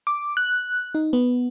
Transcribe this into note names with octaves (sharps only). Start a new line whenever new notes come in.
D6
F#6
D#4
B3